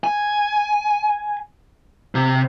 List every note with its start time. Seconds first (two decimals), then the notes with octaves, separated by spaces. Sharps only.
0.04 G#5
2.15 C3